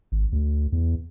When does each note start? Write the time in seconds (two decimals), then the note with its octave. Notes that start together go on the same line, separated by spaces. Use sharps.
0.12 G#1
0.32 D2
0.72 E2